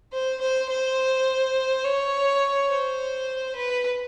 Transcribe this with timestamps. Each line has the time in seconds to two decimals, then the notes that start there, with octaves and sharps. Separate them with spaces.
0.12 C5
0.41 C5
0.69 C5
1.84 C#5
2.69 C5
3.56 B4